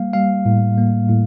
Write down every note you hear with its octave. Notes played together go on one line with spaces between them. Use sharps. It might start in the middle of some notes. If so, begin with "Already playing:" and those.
Already playing: G3 A#3 F5
G3 F5
A2
A#3
A2